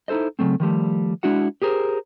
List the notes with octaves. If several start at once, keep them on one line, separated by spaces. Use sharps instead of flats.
D#4 E4 A4 C5 D#5
C#3 E3 F#3 A3 C4
D#3 F3 G3 A3
G#3 D4 E4 F#4 F#5
G4 G#4 A#4 C5